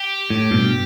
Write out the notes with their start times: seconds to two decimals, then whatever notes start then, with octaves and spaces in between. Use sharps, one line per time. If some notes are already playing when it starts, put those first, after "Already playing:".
Already playing: G4
0.30 A2
0.51 G2 B2